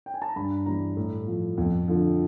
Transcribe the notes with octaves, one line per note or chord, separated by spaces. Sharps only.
G5
G#5
A5
A#5
G2 B5
E3 G3 A#5
A2
F3
F2
D3 F3